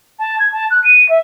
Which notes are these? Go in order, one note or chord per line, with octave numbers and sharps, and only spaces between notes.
A5
G#6
A5
F#6
D#7
E5